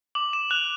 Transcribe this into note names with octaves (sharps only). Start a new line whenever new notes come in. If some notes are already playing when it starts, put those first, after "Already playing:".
D6 F#7
E7
F#6 F7